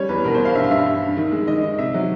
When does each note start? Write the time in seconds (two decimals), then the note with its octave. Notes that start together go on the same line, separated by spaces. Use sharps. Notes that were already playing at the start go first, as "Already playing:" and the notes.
Already playing: G3 C#4 C#5
0.09 E2 B4
0.24 B2 A#4
0.34 C5
0.40 G3
0.45 F5
0.55 G2 E5
0.64 F5
0.70 G2 E5
0.86 G2
1.02 G2
1.17 D#3
1.32 G#3
1.47 D#3 D#5
1.62 D#3
1.78 C3 E5
1.94 F#3